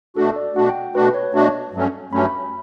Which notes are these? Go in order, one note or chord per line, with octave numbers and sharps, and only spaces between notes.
B2 A3 D4 F#4 A4
D5
B2 A3 D4 F#4 F#5
G5
B2 A3 D4 F#4 B4
C#5
B2 A3 D4 F#4 A5
G2 F#3 A3 C#4
G2 F#3 A3 C#4 B5